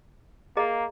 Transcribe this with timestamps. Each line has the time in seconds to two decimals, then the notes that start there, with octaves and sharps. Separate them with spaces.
0.57 A#3 G#4 D#5 A#5